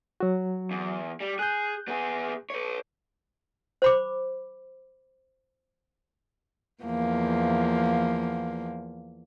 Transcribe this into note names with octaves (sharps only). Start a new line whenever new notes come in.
F#3 F#4
E2
G3
G#4 F#6 G6
B3 G#4
B4 C#5
C5 B5 D6
E2 F3 A#3